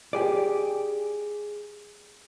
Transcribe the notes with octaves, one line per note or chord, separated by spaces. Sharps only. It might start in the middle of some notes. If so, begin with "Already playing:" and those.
G4 G#4 D5